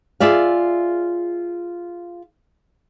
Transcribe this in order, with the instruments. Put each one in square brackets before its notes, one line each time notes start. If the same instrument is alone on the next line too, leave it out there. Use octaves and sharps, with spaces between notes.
[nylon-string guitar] F4 G#4 D5 E5 F5